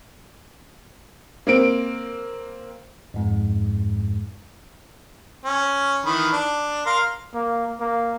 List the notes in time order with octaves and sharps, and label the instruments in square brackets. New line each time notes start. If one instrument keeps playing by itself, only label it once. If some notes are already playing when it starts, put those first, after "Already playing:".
[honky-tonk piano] A#3 C4 D7
[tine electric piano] F2 G#2 G#3
[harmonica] C#4
D#3 E3 B5
D4
A#4 F5 C6
[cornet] A#3
A#3